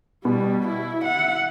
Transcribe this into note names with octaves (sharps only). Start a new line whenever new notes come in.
B2 G3 B3
E4
E5 F#5